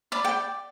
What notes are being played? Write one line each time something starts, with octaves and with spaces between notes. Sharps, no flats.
D5 B5
G5